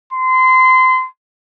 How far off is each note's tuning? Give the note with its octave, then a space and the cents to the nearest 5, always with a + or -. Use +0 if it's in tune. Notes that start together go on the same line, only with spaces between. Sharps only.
C6 -25